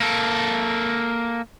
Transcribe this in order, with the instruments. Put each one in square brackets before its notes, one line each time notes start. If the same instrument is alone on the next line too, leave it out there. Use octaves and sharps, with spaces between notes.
[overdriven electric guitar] A#3 A4